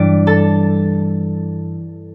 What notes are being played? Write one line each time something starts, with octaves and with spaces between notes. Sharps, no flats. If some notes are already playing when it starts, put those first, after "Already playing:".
Already playing: G2 E3 G3 D4 D5
A4 A5